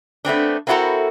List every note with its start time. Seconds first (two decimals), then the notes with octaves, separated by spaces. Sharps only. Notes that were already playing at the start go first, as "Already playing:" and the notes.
0.25 A3 B3 C4 D4
0.67 A#3 C4 E4 F#4 A4 A#4